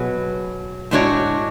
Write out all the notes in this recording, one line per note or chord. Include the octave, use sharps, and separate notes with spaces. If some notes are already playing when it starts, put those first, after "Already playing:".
Already playing: B2 F#3 G#4 B4
A2 G#3 D4 F#4 C#5